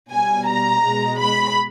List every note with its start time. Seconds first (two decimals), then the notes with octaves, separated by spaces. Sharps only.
0.11 B2 G3 G#5
0.47 A#5
0.83 B2 G#3
1.19 B5